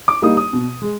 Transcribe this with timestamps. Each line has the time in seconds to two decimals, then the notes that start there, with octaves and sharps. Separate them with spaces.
0.08 D6
0.22 G3 A#3 D#4 D#6
0.37 D#6
0.53 B2
0.82 G#3